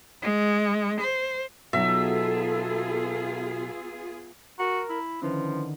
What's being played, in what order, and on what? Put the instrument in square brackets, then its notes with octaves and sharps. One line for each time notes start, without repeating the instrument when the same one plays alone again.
[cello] G#3
C5
[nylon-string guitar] B2 F#3 D#4 [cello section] B3 F4 G#4 [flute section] A4 [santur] E5
[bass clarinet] F#4 [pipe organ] A#4
[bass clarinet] E4
[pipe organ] D3 D#3 [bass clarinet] F3 [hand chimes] C#4 E4 B4